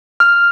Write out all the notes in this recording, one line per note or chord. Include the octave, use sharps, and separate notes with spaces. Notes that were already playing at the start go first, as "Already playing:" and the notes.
F6